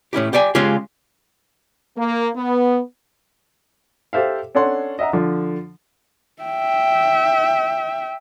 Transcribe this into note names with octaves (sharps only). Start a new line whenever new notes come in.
A2 C#4 E4 G4
G4 D5 G5 G#5
C#3 G#3 C#4 F4 G4 G#4
A#3
B3
G4 A4 C5 E5 F5
C#4 D4 A4 C#5 F#5 C6
D#5 E5 F#5 A#5
D3 F3
E5 G5